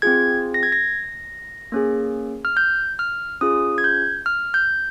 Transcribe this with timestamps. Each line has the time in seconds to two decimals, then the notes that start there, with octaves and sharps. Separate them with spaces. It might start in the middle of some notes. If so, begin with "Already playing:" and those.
0.02 C4 F4 G#4 G#6
0.54 A#6
0.63 G#6
0.72 A#6
1.72 A#3 C#4 G#4
2.45 F6
2.57 G6
2.99 F6
3.41 C#4 F4 G#4 D#6
3.78 G#6
3.84 G6
4.26 F6
4.54 G6